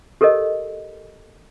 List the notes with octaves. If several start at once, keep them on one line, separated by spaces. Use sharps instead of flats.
G4 A4 A#4 C#5 D#5